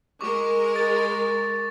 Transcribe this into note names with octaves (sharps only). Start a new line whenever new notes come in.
G#3 A#4 C#6 D6
A6